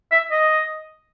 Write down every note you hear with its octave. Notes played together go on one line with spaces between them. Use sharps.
E5
D#5